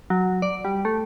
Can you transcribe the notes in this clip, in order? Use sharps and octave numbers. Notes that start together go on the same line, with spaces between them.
F#3
D5
G3
A3